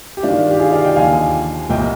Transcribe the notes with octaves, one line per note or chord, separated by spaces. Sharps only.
G4
G2 D#3 D4 F4
G4
F4 G#4
D5 F5
D#5 G5
D#2 D3 F3 F5 G#5
C2 A#2 F3 D#5 G5